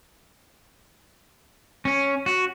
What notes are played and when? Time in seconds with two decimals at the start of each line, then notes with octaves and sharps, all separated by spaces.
1.85 C#4
2.26 F#4